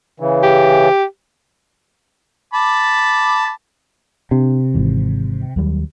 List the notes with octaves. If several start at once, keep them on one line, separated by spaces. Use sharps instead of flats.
C#3 E3
G4
A5 B5 D6
C3 D4
G#1 G#2 E3
D#2 F#3 G3